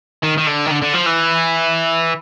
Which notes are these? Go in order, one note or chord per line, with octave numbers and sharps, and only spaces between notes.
D#3
D#3
D3
D#3
D3
D3
F3
E3